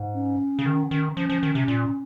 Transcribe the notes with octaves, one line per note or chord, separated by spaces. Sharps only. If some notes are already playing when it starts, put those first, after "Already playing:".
Already playing: G#2
C#4
C#3
D#3
D#3
F3 C#4
F3
D#3
C3
A#2